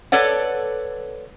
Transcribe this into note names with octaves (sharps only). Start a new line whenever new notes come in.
A4 B4 C#5 D5 F#5